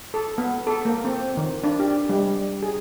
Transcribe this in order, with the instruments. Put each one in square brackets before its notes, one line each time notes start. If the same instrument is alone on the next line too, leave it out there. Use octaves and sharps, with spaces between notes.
[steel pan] A4
B3
A4
A#3
C4
D#3
D4
G4
G3
G#4